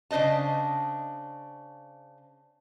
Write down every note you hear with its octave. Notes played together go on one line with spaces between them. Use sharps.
C#3 D4 C5 D#5 A5